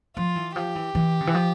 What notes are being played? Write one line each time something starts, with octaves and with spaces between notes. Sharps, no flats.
F3 F4
E3
F3 G4
E3
E3
C#3
E3
F3